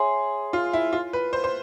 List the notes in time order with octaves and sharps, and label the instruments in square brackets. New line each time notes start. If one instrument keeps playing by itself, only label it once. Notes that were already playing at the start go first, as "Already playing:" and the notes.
Already playing: [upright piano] G#4 [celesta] C#5 E5 G#5 C6
[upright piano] F4
E4
F4
B4
C5
C5